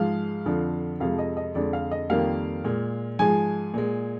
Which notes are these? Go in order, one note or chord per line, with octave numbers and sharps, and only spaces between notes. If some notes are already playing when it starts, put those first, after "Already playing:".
Already playing: G#2 F3 G#3 F5
F2 D3 F3
F2 C3 F3 G#3 F5
D#5
D#5
F2 D3 G#3 D5
F5
D#5
F2 D#3 G3 A#3 F5
A#2 G#3
G#2 F3 G#3 G#5
A#2 G#3